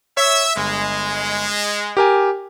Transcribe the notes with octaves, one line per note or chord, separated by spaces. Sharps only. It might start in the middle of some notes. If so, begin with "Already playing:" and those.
C#5 E5
G1 G#3
G4 A#4 G#5